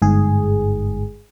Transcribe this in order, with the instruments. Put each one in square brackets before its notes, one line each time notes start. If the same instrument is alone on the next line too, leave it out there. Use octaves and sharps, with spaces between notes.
[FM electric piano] G1 G#2 G#4